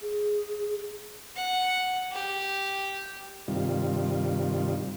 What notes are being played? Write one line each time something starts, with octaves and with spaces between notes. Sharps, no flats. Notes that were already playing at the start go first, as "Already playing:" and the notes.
G#4
F#5
G4
G2 C3 D#3 G3 F4